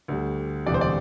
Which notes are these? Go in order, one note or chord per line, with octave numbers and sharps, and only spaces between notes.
D2 D3 G3
E1 D2 C3 E3 G3 D5
C5
D5